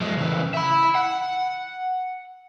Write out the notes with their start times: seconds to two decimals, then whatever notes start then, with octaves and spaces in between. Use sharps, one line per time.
0.01 F3 G#3
0.18 C#3 E3
0.54 E5 B5
0.95 F#5